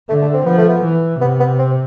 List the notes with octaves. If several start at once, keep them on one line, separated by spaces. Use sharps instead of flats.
D3 A3
A3
C4
F3 B3
A3
B3
E3
C3 B3
B3
C4